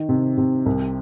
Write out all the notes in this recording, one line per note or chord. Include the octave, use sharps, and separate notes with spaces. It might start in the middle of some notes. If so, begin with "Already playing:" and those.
Already playing: D#3
C3
C3
C2